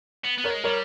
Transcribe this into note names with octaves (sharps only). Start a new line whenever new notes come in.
B3
B3
A#4 C#5
G#3
G3 A#4 C#5